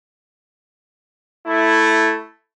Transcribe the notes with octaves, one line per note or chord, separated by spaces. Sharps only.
A3 E4